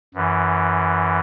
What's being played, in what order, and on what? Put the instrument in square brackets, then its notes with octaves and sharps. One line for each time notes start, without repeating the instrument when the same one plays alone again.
[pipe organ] F#2 E3